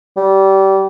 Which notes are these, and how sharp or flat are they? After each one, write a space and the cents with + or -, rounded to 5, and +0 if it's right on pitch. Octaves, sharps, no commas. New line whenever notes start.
G3 -25